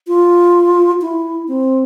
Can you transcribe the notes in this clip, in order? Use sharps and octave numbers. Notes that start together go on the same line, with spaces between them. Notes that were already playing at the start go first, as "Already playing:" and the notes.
F4
E4
C4